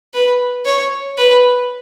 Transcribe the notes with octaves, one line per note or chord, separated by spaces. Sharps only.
B4
C#5
B4